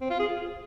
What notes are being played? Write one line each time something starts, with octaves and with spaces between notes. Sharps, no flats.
C4
F4
G#4